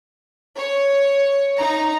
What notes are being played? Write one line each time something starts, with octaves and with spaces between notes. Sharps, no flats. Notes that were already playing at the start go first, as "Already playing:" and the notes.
C#5
D#4 A#5